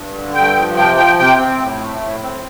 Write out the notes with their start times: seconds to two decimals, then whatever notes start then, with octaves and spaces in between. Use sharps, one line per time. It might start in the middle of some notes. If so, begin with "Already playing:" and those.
Already playing: G2
0.14 D3
0.34 G2 G5
0.56 F3
0.77 C3 G5
0.97 F3 G5
1.19 C3 G5
1.39 C4
1.60 A2
1.81 A3
2.02 A2
2.23 C4